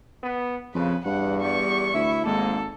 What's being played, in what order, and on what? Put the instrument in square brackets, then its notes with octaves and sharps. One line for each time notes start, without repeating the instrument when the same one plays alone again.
[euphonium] B3
[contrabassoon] F2 [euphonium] C#3 [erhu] B4
[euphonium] E2 [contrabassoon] G2 [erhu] F#5
[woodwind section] G3 B3 G4 [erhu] C#6
[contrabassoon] D2 [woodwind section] E4 E5
[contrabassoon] G#1 [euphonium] G#2 [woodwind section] G#3 A#3 [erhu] A4